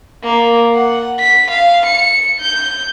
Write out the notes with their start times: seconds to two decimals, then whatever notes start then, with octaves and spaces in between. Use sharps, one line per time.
0.23 A#3
0.76 F#5
1.19 B6
1.51 F5
1.86 C#7
2.41 G6